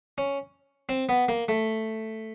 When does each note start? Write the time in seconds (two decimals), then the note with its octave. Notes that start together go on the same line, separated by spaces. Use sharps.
0.18 C#4
0.89 C4
1.09 B3
1.28 A#3
1.48 A3